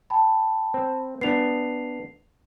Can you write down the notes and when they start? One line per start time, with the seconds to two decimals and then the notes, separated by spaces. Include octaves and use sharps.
0.10 G5 A5 B5
0.74 C4
1.21 B3 D4 C7 F7